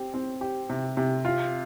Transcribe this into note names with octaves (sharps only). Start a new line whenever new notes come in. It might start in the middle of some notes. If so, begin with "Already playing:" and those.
Already playing: C4 G4
C4
G4
C3
C3
F4